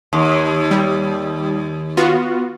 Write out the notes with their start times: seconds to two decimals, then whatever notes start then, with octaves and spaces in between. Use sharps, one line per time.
0.13 D#2
0.71 G3
1.97 B3 F4 F#4